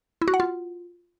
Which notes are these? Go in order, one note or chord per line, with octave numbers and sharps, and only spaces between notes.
E4
F#4
F#5
F4